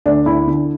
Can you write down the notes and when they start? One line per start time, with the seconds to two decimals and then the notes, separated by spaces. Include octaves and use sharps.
0.06 D2 D4
0.26 D2 E4
0.47 D3